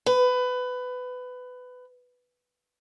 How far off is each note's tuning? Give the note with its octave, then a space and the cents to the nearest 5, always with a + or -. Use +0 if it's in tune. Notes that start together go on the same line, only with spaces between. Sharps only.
B4 +20